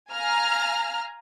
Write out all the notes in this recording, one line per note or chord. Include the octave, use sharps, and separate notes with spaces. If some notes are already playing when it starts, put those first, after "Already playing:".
F5 G#5 A#5 F6